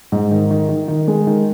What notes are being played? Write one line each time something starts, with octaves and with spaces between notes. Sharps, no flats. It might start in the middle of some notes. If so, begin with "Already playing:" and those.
G#2
D#3
D#3
D#3
D#3
G#3
D#3